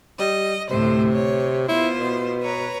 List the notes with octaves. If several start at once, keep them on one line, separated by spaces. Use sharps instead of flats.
G3 D#5
D2 A2 C3 C5
C#5
B3 E4 F4 C5
B2
B4 C#5 A#5